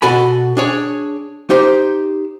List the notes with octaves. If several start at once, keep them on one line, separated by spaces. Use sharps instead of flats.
B2 F#4 A4 G#5 B5
D4 G#4 C#5
D#4 G4 C5